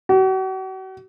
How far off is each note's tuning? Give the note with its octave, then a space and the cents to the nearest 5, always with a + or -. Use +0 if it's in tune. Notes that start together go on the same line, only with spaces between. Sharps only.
F#4 +40